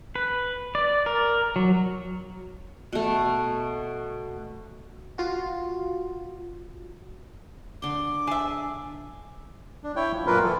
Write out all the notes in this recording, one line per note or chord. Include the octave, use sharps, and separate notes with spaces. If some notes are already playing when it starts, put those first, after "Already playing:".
B4
D5
A#4
F#3
B2 A3
F4 F#4
D3 C6 D6
G#4 E5 A5
D4
E4 C#5 G5
F3
F#2 A#2 A#3 F4 A#4 B4
E3 A4